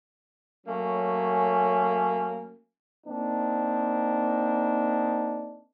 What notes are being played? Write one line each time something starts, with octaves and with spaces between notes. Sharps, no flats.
F#3 A3 A#3 C#4 G#5
A#3 C4 D4 D#4